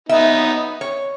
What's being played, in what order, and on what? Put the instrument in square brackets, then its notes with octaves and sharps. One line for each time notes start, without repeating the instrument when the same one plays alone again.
[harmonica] B3 D#4 [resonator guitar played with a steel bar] E5
[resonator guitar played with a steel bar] C#5